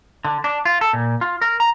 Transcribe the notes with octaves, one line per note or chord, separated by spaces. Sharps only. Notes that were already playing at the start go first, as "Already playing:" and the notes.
D3
D4
F4
A4
A#2
F4
A#4
A#5